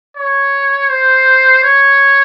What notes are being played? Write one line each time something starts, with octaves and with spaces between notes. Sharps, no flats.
C#5
C5
C#5